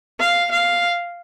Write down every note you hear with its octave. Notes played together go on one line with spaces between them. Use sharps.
F5
F5